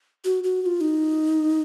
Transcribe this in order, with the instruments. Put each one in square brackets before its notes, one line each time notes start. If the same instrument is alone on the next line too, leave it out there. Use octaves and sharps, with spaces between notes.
[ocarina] F#4
F#4
F#4
F4
D#4